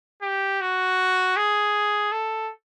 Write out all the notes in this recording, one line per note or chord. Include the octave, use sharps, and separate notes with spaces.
G4
F#4
G#4
A4